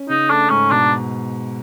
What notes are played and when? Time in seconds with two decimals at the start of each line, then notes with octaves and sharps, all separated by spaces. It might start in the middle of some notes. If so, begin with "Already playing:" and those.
Already playing: C#4
0.09 C#3 D#4
0.30 A3 D4
0.50 G#2 C#4
0.71 B2 D4